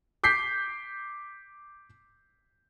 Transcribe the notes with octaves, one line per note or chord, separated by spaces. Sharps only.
D6 G6 B6 C7